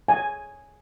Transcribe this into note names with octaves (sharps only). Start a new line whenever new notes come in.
G#5